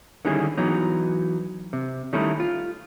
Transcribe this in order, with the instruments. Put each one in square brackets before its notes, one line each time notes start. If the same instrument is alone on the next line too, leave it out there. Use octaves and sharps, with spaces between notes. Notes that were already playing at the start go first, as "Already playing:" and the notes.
[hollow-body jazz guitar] D3 D#3 G3 C#4 E4 G#4
E3 F#3 B3 D#4
C3
D#3 G3 A3 C#4 D#4 E4
F4